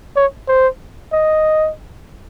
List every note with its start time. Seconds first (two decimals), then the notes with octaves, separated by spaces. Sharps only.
0.16 C#5
0.48 C5
1.13 D#5